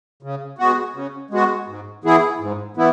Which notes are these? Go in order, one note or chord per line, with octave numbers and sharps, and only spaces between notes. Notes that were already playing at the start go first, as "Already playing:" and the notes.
C#3
G#3 B3 F#4
C#3
G#3 B3 F#4
G#2
E3 B3 E4 G#4
G#2
E3 B3 E4